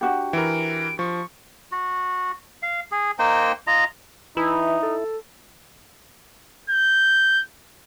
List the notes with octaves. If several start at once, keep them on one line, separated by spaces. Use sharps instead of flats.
D4 F#4 G4
E3 A#4 D7
F3 C#6
F#4
F5
G#4
A#3 D#4 C5 G5
F4 D#5 A#5
E3 D#4 E4
A4
G6